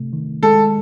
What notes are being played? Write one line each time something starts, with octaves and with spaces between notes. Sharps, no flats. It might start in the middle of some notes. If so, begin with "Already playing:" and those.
Already playing: C3 A3
D#3
G#3 A4